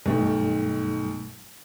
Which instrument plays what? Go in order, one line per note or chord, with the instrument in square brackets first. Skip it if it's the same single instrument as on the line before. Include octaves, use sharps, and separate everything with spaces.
[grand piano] B1 D#3 [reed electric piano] G2 G3 A3